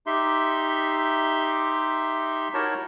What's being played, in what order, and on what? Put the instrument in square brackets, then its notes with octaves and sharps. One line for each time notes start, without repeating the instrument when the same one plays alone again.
[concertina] D#4 G4 E5 C6
D#4 E4 F#4 A#4 C#5 A5